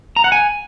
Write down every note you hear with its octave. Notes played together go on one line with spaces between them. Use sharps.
A#5
F#5
G#5